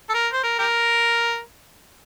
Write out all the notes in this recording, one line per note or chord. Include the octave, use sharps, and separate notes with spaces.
A4
A#4
C5
A#4
G4 A#4